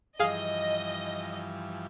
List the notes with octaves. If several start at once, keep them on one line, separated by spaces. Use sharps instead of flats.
G2 E3 F3 G#4 D#5 F5